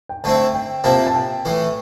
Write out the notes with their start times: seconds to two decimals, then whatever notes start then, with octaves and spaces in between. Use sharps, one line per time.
0.09 G5
0.24 D3 A3 C4 E4 A5
0.54 G5
0.84 C3 F3 A#3 E4 A5
1.07 A5
1.15 G5
1.45 A2 E3 A3